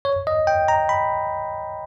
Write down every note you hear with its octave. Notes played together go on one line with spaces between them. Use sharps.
C#5
D#5
G5
A#5
B5